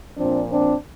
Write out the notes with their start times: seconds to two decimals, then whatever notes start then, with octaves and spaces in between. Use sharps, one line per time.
0.17 A#2 F3 C4 D4
0.52 C4 D4